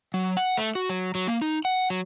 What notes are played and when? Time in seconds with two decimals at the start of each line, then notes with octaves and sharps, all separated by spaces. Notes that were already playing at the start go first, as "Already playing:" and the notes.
0.14 F#3
0.37 F#5
0.57 A3
0.75 F#4
0.89 F#3
1.15 F#3
1.27 A#3
1.42 D#4
1.65 F#5
1.90 F#3